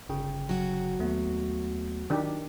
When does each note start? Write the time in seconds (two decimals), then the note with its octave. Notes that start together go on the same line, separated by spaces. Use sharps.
0.09 G1 C#3 G5
0.49 F#3 F#4
0.99 D#2 A3 B3
2.10 D#3 D4 G4 A#4